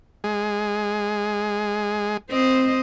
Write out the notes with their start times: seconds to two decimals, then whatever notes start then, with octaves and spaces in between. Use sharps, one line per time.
0.24 G#3
2.30 C4 C5 D#5